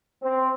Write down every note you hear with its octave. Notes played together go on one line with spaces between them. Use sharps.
C4